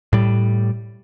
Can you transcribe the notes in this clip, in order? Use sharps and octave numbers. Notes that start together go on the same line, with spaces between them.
A2 G3